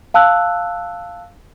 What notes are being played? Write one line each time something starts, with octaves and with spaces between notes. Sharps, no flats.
F5 A5 E6 F#6